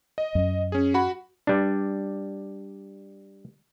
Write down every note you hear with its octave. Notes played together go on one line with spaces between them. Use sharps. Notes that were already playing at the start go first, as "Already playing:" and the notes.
D#5
F#2
C#4 G#4
F#4 F#5 B5
G3 D4